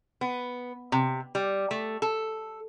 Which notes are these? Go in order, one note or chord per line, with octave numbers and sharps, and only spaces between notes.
B3
C3
G3
A3
A4